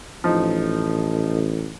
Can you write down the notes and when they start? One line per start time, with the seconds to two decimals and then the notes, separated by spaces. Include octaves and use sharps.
0.24 A1 F3 D#4